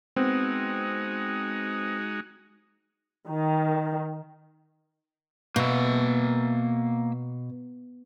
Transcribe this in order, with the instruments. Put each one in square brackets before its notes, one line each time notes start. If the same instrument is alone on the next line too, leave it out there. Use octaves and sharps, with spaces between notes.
[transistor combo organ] G#3 D#4 F#4 [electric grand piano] B3 C4
[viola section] D#3
[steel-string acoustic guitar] B2 [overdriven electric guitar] A#3 E5